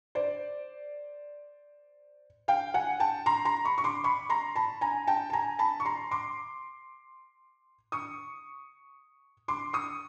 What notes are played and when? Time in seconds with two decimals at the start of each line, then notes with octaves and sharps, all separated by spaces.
0.15 C5 D5
2.48 F5 G5
2.74 F#5 G#5
3.00 G5 A5
3.26 A#5 C6
3.45 A#5 C6
3.65 B5 C#6
3.78 C#6
3.84 C6 D6
4.04 B5 C#6
4.29 A#5 C6
4.56 A5 B5
4.81 G#5 A#5
5.07 G5 A5
5.30 A5
5.33 G#5 A#5
5.59 A5 B5
5.80 C#6
5.85 A#5 C6
6.11 C6 D6
7.92 C#6 D#6
9.48 C6 D6
9.73 C#6 D#6